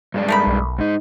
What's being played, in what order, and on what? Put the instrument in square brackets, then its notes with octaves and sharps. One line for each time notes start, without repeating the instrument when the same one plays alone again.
[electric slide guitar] G2 G#3 D5
[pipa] A3 A#4 B5 [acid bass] D#4
[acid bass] B1
[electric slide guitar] G#2 D#4